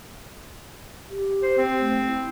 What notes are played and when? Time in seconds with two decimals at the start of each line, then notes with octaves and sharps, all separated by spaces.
1.10 G4
1.42 C5
1.58 C4
1.79 A3
2.07 E4